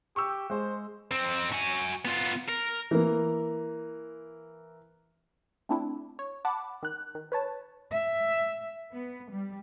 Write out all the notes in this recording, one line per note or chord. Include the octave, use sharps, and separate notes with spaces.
G4 C#6 E6
G#3 C5
F2 C4
F#4 G#5
B3 F4
A#4
E3 A#3
A3 C4 D4 E4
C#5
F#5 A5 B5 D6
D#3 F#6
D#3
B4 C#5 A5
E5
B3
G3